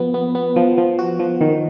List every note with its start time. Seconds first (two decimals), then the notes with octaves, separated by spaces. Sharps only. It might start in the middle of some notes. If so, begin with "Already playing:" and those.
Already playing: F3 B3
0.14 B3
0.35 B3
0.56 F3
0.78 F3
0.99 F#4
1.19 F3
1.41 D#3